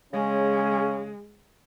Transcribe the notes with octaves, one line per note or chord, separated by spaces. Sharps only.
C#3 G#3 C#4